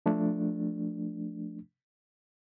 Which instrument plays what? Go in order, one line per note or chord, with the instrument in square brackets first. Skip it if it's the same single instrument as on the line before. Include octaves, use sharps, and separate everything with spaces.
[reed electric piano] F3 A3 D4